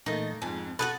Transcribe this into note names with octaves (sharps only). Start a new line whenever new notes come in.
A#2 E3 A3 A#3 D#4 D#5 A6
F2 G#2 C4 G#5 A5
F#4 G#4 A4 B4 D#6 A6